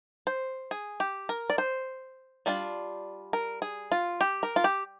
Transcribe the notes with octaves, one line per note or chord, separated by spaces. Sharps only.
C5
G#4
G4
A#4
D5
C5
G3 D4 F4
A#4
G#4
F4
G4
A#4
F4
G4